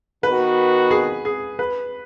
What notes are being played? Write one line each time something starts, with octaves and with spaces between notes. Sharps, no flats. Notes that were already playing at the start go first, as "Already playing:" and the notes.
D#3 B3 F#4 B4
G#4
G#4
B4